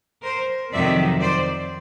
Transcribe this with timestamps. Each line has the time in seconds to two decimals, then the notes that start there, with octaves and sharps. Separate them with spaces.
0.24 A#4 C5
0.72 F2 C3 D#3 F#3 D5 E5
1.20 C5 D5